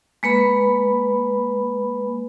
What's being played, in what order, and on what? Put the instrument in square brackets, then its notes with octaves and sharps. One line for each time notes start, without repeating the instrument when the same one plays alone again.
[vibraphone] G#3 A#3 B4 B5